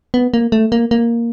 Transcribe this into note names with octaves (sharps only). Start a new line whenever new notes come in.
B3
A#3
A3
A#3
A#3